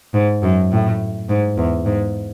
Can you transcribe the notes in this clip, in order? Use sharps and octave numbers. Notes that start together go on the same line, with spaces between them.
G#2
F#2
A2
G#2
E2
G#2